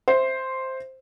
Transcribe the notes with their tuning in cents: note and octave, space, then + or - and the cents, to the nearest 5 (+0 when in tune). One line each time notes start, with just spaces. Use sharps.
C5 +0 E5 +0